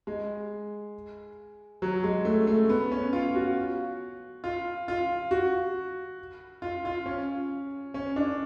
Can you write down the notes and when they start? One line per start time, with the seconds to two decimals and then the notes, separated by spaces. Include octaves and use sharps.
0.07 G#3
1.82 F#3
2.03 G#3
2.25 A3
2.47 A3
2.69 B3
2.91 C#4
3.13 F4
3.35 F#4
4.44 F4
4.88 F4
5.31 F#4
6.62 F4
6.85 F4
7.06 C#4
7.94 C#4
8.16 D4